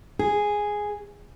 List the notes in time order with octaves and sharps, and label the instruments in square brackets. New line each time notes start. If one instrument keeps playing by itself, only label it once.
[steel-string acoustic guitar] G#4